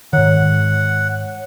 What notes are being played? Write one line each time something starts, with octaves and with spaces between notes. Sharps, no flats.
G#2 D#3 C#5 F#5